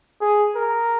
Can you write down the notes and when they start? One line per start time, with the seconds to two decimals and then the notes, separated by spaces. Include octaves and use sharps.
0.21 G#4
0.55 A#4